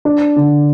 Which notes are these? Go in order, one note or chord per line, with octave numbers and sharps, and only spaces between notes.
D4
D3